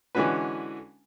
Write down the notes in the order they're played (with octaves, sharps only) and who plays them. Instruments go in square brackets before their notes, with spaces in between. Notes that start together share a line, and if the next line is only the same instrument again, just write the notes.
[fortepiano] D3 E3 G#3 C#4 F#4 B4